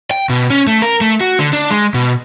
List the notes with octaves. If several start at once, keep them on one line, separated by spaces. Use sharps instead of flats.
G5
B2
C#4
A3
A#4
A3
F#4
D3
D4
G#3
B2